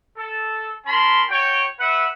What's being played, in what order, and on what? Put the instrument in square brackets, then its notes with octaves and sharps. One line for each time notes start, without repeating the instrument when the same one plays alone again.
[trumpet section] A4
C#4 A#4 A5 B5 C6
F#4 C#5 G5
B4 E5 F#5